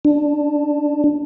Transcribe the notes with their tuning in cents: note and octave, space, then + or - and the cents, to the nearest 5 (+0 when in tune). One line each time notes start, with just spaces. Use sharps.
D4 +5